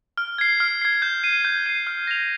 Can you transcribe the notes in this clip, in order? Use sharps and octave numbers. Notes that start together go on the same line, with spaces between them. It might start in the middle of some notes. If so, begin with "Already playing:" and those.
F6
G#6 C7
F6
G#6 C7
G6
C7 D#7
G6
C7 D#7
F6
A#6 F7